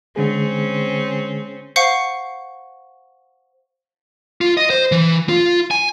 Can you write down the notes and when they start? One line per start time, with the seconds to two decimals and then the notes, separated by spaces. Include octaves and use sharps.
0.16 D3 G#3 C4 C#4 G#4
1.76 C5 F5 F#5 C#6 C#7
4.41 F4
4.57 D#5
4.70 C5
4.92 E3
5.29 F4
5.71 G#5